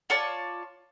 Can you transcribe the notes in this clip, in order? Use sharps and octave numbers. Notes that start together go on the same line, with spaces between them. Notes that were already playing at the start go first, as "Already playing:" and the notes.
F4 C#5 D5 A5